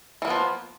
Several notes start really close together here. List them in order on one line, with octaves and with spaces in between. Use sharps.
E3 A#3 B3 F3